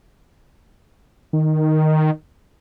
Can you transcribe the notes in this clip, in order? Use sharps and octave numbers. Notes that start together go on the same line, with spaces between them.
D#3